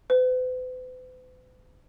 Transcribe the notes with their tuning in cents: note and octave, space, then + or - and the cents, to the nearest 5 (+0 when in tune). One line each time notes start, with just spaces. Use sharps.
B4 +45